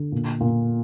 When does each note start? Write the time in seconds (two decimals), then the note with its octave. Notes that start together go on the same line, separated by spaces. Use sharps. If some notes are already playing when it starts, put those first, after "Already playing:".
Already playing: D3
0.12 A#2
0.41 A#2